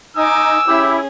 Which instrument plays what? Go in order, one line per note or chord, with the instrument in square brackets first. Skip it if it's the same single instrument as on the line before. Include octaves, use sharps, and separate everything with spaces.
[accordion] D#4 [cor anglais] D#5 [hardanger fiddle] G#5 D6 [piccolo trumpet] E6
[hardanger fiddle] C#4 G#4 [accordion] E4 [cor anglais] G4